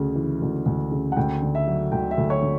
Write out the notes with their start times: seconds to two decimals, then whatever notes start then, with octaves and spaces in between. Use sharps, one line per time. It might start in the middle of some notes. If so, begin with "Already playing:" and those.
Already playing: D2 C#3
0.15 E3
0.42 D2
0.66 D2
0.92 C#3
1.12 F#5
1.17 D2 G5
1.42 D3
1.55 E5
1.67 F#3
1.92 D2 G5
2.11 E5
2.18 D2
2.30 C#5
2.42 D3